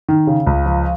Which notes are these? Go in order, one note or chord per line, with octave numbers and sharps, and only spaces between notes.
D#3
C#3
C#2
F3